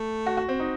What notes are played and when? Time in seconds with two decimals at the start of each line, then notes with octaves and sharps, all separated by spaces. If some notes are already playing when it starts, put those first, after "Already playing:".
Already playing: A3
0.26 F#4
0.37 F#4
0.49 C4
0.60 D#4